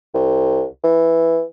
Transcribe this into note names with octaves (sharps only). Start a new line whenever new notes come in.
C2
E3